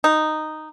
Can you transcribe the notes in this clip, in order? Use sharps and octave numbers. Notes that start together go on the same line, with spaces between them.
D#4